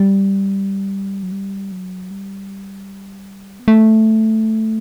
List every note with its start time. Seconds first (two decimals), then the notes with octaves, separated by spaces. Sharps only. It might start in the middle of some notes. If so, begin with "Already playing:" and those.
Already playing: G3
1.23 F#3
1.32 G3
1.72 F#3
2.11 G3
3.60 B3
3.68 A3